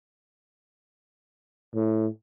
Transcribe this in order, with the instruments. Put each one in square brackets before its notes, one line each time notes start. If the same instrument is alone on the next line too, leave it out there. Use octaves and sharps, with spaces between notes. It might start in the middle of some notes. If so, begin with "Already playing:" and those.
[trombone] A2